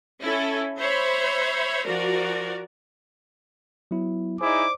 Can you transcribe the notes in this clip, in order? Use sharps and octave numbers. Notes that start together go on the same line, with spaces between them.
C#4 E4 A4
C5 C#5 E5 B5
F3 F#4 A#4 D5
F#3 B3 E4
D#4 E4 G#4 C5 D5 D6